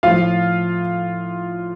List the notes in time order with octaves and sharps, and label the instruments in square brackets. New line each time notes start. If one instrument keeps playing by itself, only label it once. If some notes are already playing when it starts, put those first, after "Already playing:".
[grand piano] A2 F3 F4 F5